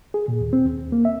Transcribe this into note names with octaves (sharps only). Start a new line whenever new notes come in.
G#4
A#2
D#2
C4
D#2
A#3
E5